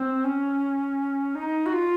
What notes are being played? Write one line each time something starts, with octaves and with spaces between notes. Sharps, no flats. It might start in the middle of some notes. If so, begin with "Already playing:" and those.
Already playing: C4
C#4
D#4
F#4
F4